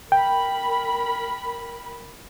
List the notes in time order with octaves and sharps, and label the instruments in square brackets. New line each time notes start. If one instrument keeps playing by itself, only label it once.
[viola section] A#4 B5 [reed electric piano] G5